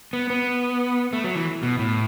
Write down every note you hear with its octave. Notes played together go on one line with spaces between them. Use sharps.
B3
B3
A3
F#3
E3
B2
A2